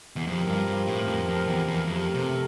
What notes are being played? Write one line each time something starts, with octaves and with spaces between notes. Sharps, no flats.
E2
F2 F3 C4 G4 A#4
G2
G2
A2
F2
F2
E2
E2
F2 A3 C4 G4 A#4
C3